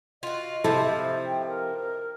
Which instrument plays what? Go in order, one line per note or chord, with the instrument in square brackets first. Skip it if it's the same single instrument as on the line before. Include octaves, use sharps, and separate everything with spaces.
[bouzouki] F4 F#4 [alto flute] D#5
[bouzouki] C3 F3 [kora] E4 A4 C5
[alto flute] G5
A#4